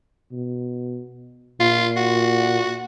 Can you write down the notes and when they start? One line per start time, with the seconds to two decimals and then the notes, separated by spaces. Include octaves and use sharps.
0.32 B2
1.60 A#2 F4
1.96 F#4